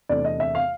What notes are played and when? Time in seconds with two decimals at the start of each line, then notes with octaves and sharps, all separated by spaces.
0.09 E2 C3 E3 A3 D4 D5
0.25 D#5
0.40 E5
0.55 F5